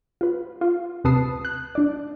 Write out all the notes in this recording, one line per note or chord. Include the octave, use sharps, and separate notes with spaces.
F4 B4
F4
D2 C3 B4 A5 D#6 C7
F#6
D4 D5